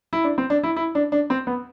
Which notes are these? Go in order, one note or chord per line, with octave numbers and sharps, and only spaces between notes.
E4
D4
C4
D4
E4
E4
D4
D4
C4
B3